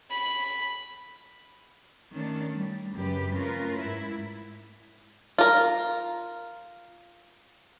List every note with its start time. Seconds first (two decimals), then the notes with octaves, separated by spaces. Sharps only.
0.11 B5
2.13 D#3 A3 C#4 D4
2.54 G3
2.95 F#2 C#3 G4 B4
3.34 A3 C#4 F4 A#4 B4
3.79 G#2 E4
5.38 F4 A#4